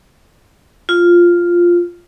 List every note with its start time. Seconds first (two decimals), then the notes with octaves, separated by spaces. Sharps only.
0.89 F4